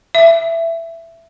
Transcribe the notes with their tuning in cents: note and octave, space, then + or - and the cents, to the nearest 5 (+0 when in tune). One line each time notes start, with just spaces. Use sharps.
E5 +10